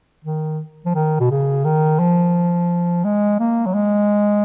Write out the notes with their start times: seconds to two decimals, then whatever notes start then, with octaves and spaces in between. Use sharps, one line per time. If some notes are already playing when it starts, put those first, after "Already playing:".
0.25 D#3
0.86 F3
0.95 D#3
1.20 B2
1.31 C#3
1.65 D#3
2.00 F3
3.05 G#3
3.40 A#3
3.66 F#3
3.74 G#3